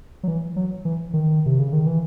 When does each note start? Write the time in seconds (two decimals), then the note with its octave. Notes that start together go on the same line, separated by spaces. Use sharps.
0.23 F#3
0.28 E3
0.56 F#3
0.85 E3
1.14 D#3
1.46 C3
1.59 C#3
1.73 D#3
1.86 E3